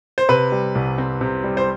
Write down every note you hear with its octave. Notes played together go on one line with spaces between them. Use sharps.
C5
C3 B4
G3
C2
C4
C3
G3
C5